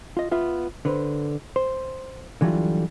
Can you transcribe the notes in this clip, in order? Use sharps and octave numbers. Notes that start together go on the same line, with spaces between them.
F4 D#5
B3 F4 E5
D3 B4 C5
C5
D3 E3 F#3 G3 F4